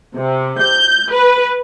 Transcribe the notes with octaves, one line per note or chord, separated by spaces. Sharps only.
C3
G6
B4